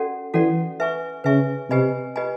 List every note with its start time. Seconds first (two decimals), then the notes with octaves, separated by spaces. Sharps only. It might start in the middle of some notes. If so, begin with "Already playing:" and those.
Already playing: C#4 F#4 A4 D5 F#5
0.34 E3 C#4 F#4 A4 D5 F#5
0.80 B4 E5 G#5 C#6
1.24 C#3 B4 E5 G#5 C#6
1.70 C3 G4 B4 D#5 G#5 B5
2.16 G4 B4 D#5 G#5 B5